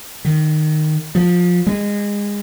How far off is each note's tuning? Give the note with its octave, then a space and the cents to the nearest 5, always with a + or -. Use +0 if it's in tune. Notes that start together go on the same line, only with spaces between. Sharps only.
D#3 -15
F3 +20
G#3 -25